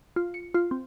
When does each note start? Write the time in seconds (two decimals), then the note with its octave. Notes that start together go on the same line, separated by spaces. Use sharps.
0.16 F4
0.34 C#7
0.54 F4
0.71 C4